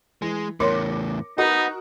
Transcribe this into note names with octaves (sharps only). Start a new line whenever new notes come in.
E3 G#3
E2 A2 A#4 C#5 C6 D6 A#6 C#7
D#4 F#4 A#4 B4 D#5 F#5 D#6